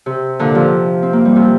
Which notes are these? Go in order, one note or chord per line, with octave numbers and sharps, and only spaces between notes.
C3
A#2 D3
C3 F3
C4
A#3
G3
C3 F3